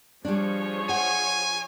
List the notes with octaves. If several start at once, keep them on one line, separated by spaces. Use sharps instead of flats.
F3 G3 D4 G#4 C#5
F#5 G#5